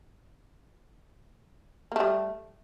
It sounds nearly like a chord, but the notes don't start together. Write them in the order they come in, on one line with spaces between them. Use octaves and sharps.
A#3 A3 G3